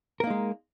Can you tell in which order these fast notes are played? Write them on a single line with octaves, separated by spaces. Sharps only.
A#4 A#3 D#4 G#3